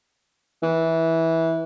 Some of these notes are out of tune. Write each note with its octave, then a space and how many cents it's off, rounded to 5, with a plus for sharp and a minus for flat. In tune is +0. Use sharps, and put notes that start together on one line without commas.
E3 -15